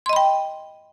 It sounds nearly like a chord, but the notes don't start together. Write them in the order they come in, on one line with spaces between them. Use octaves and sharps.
C6 D#5 B5 G5